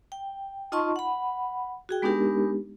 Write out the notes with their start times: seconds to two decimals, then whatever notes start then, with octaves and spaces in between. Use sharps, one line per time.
0.12 G5
0.72 D#4 F4 D#5 A5 C6 C#6
0.96 F#5 B5
1.89 F#4 G#4 G5
2.02 G#3 B3 D4 D#4 G4 A#4